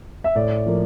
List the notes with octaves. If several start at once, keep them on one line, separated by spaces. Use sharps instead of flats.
E5
A2 D5
F3 A#3